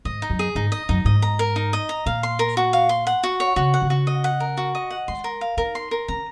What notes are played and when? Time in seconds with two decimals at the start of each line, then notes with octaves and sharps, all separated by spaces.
0.05 G#2 D#5
0.22 D#4
0.30 F#2
0.39 G#4
0.55 G#2 D#4
0.72 D#5
0.89 F#2 D#4
1.05 G#2 D#5
1.22 A#5
1.39 A#4
1.56 D#4
1.73 D#5
1.89 A#5
2.06 A#2 F5
2.23 C6
2.39 A#4
2.57 F#4
2.73 F5
2.89 C6
3.07 F#5
3.24 F#4
3.40 C#5
3.56 C#3 F#4
3.74 F#5
3.82 C#3
3.90 F#4
4.07 D#5
4.24 F#5
4.40 A#4
4.57 F#4
4.75 D#5
4.90 F#5
5.08 G#3 C6
5.24 A#4
5.41 F5
5.57 D#4 A#4
5.75 C6
5.91 A#4
6.08 C#4 A#5